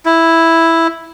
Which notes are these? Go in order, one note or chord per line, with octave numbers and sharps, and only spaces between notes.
E4